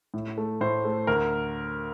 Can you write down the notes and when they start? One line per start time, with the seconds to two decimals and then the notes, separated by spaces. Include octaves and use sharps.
0.14 A2
0.38 A3
0.61 A2 C5
0.85 A3
1.07 D2 A#4